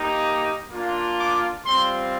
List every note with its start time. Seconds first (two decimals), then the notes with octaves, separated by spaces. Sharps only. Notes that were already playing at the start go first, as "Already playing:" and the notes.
Already playing: A#3 D#4 G4
0.70 A#3 D4 F4
1.17 D6
1.65 G3 C4 F4 C6